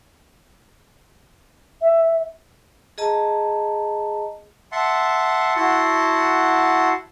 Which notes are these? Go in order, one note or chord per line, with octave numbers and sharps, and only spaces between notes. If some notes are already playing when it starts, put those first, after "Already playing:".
E5
G#4 D#5 A5 A#5
E5 F#5 A5 C6
E4 F#4 F#5 A5 C6